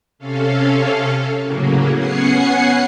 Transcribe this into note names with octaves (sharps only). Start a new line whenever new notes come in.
C3 C#4 A4 F5
A2 C#3 F#3 A#3
B3 C#4 F#5 G#5 C7 C#7